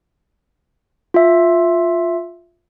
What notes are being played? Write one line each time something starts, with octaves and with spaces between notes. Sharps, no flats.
F4 E5